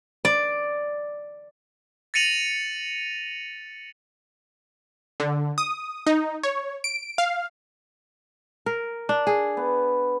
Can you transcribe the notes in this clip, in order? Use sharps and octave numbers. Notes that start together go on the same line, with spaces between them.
D5
A6 A#6 C#7 D#7 F7 F#7
D3
D#6
D#4
C#5
D7
F5
A#4
D4
G#4
B3